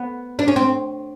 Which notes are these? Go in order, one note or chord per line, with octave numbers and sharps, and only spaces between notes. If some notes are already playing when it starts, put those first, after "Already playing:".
Already playing: B3
D4
C#4
C4